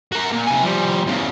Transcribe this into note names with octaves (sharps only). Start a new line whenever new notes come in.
F#4 A#4
A#2
C3 G#5
F3 G3
E2 C#3